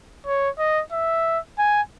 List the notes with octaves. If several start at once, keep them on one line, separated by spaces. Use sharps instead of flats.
C#5
D#5
E5
G#5